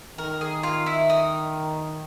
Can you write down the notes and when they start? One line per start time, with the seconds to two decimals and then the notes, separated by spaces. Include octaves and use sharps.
0.18 D#3 A#4
0.41 G#4
0.63 F4
0.86 E4
1.10 D#4